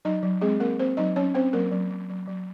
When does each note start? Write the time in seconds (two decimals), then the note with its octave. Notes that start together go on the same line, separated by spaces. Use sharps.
0.05 F#3 D#4 D#5
0.23 F#3
0.41 G#3 C4 G#4
0.60 A#3 C4 A#4
0.79 C4 C5
0.97 F#3 D#4 D#5
1.16 F#3 C#4 C#5
1.35 C4 C5
1.53 F#3 A#3 A#4
1.72 F#3
1.91 F#3
2.10 F#3
2.28 F#3